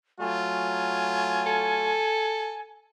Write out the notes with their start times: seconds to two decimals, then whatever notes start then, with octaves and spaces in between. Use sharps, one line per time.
0.21 F#3 A3 F4 G#5
1.46 A4